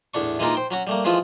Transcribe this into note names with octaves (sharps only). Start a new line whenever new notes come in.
E2 A2 D4 C#6
E3 G#3 A#3 D#4 F4 A#4
C5 G5
F#3 C#4 F#4
G3 A3 A#3
E3 F3 G#3 A3 F4